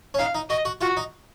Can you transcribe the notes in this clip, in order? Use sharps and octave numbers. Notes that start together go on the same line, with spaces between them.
C#4
D#4 F5
D#4
F#4 D#5
F#4
F4 F#4
D#4